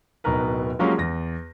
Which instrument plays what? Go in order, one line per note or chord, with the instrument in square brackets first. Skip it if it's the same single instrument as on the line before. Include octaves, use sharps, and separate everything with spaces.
[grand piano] D1 B2 D#4 A#4 B4
F3 F#3 G#3 A#3 C#4 G4
E2 A#6